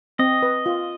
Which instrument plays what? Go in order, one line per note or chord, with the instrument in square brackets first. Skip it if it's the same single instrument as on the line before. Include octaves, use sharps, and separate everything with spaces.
[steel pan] C4 [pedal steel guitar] D#5
[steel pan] B4
F4